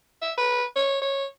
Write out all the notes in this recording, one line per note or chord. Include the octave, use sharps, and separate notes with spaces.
E5
B4
C#5
C#5